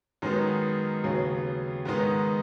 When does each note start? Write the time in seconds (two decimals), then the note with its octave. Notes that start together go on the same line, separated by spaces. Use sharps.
0.22 F#2 D#3 G#3 B3 D#4
1.04 D#2 C#3 F#3 B3 G#4
1.85 G#2 D#3 G#3 B3 D#4